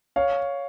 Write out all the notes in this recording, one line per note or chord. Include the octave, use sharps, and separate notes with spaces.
C#5 F5